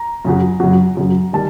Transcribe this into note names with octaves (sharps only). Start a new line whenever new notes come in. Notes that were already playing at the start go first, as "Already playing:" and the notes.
Already playing: A#5
F#2 C#3 F#3
F#2 C#3 F#3
F#2 C#3 F#3
D#3 G3 A5